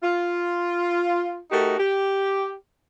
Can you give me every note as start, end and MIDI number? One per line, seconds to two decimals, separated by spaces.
0.03 1.40 65
1.52 1.79 57
1.52 1.79 63
1.52 1.79 66
1.52 1.79 67
1.52 1.79 70
1.79 2.55 67